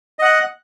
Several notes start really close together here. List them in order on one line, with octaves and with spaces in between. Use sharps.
D#5 F#5 F#6